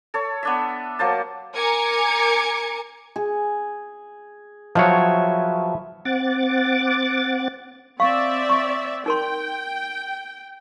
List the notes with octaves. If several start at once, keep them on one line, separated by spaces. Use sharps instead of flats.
A4 C#5
B3 D4 E5
F#3 A#3 C5 A5
A#4 G#5 A#5 D6 G#6 C#7
G#4
F3 F#3 B4 C#5 E5
C4 F#5 D6 A6
C4 D5 E5 F5 C#6
C#6
D#4 A#4 G5 C6